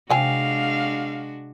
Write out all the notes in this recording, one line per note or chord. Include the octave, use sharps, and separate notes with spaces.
C3 G#3 D4 F#4 F5 G5 G#5